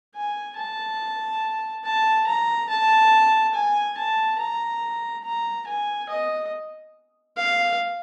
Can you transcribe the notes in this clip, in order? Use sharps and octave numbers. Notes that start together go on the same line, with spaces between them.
G#5
A5
A5
A#5
A5
G#5
A5
A#5
A#5
G#5
D#5
F5